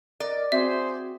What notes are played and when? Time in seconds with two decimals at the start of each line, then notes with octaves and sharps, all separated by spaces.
0.20 A#4 D5 D#5
0.52 C4 F#4 G#4 C5 E5